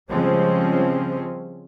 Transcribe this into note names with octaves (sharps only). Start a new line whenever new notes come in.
C#3 F3 G3 G#3 C4 C#4